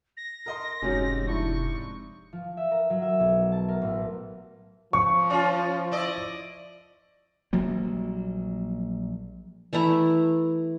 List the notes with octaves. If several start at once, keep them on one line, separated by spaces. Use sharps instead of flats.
A#6
A#4 D#5 C6
F1 G#2 C3 G#3 C#4 F#4
D4 E4 C#6
F3
E5
A#4
F#3
E5
B1
A5
A#4
A1
F3 C#6
C#4 F4
E4 D5 D#5
A#1 F#3 G3 A#3
E3 A3 E4 A#5